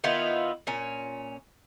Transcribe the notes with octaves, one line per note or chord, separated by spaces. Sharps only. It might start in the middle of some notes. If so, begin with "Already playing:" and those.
D#3 B3 E4 F4
A#2 C#4